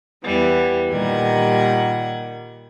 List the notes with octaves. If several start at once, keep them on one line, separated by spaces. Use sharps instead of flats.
E2 E3 G3 B3
A#2 D#3 G3 F#5 G#6